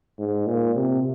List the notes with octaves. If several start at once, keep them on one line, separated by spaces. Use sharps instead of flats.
G#2
A#2
C3